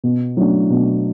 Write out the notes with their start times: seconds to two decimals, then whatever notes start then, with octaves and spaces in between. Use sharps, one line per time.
0.04 B2
0.37 F#3 A3 D4
0.70 B2